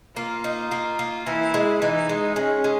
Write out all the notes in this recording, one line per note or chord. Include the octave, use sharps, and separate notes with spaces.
A#3 F4
D#4
A#3
A#3
E3 E4
G#3
E3 D#4
G#3
G#3 C#4
G#3